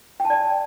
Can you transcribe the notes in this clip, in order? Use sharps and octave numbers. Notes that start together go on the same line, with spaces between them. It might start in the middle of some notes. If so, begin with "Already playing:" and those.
G5
A5
D5